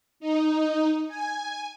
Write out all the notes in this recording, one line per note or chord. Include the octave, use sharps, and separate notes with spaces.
D#4
G#5